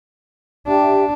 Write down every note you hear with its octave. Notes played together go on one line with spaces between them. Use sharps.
D4 G4 E5 G5